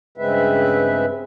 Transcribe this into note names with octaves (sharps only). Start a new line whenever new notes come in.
G2 C#3 G#3 C4 B4 E5